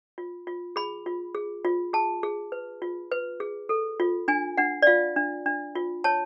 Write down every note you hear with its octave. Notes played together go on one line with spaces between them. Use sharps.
F4
F4
G#4 B5
F4
G#4
F4
G#4 A5
G#4
B4
F4
B4
G#4
A4
F4
D4 G#5
D4 F#5
D5
F4 F5
D4
D4
F4
C#5 A5